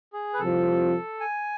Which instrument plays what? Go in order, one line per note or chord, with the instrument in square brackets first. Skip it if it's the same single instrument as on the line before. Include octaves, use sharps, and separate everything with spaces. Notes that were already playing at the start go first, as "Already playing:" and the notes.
[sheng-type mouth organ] G#4
B4
[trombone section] C2 C3 F3 [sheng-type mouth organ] A4
[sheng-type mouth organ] G#5